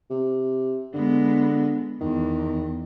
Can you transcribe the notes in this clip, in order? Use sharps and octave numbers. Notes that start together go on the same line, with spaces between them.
C3
D3 G#3 B3
E2 D#3